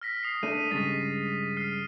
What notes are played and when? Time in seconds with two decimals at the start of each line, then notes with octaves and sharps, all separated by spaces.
0.01 F6 A#6 B6
0.23 D#6 C7
0.43 A3 D4 A4 D#7
0.71 G2 C#3 G#3 A6 B6
1.57 F6 C7